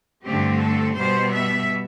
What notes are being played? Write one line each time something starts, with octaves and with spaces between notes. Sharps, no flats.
G2 D3 A3 C4 G4
A4
B2 G3 B3 C5
E5